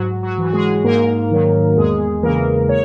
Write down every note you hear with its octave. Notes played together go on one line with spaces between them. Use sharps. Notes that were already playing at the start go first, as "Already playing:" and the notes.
Already playing: G#2 F#3 F#4
F#3 F#4
E3
F#4
G#3 G#4
G#2 A#3 A#4
D#3 F#3
E2 G#3 G#4
C#3 E3 A#3 A#4
C#5